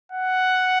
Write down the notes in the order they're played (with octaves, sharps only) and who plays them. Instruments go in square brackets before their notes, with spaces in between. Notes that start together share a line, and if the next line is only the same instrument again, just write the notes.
[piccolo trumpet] F#5